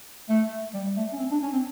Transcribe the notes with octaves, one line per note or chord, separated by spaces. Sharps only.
A3
G3
A3
C#4
C4
D4
C#4
C4